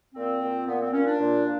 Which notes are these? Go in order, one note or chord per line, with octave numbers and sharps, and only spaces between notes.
A#2 C4
A#2
A#2 B3
C4
A#2 C#4
D4
A#2
A#2